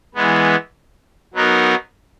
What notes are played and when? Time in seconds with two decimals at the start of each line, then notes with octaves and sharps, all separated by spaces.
0.14 E3 G#3 B3
1.34 F#3 B3 D#4 A#4